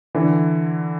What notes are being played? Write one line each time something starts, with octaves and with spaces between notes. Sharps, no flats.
D3 E3